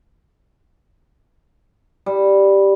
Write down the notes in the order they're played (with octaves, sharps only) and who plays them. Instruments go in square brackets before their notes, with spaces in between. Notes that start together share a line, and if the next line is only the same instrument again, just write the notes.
[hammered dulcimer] G3